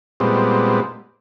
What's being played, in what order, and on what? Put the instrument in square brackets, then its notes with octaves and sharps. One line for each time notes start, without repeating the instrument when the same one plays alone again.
[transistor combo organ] A#2 G3 G#3 B3 C4